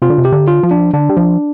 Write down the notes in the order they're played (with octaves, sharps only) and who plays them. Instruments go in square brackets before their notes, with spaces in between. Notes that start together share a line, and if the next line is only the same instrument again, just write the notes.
[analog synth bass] C3 [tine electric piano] F4
[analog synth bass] D3
C3
[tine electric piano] G4
[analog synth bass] D3
[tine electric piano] F4
[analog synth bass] F3
[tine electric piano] D4
[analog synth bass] D3 [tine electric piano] D4
[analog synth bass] G3
F3